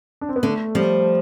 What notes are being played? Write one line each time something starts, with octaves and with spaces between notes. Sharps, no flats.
D4
C4
B3
D3 A3
F3 G3